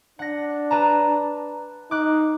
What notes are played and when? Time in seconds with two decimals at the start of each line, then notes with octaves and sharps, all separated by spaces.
0.19 D4 F#5 A#6
0.71 B4 A5 A#5
1.91 D#4 D6 F#6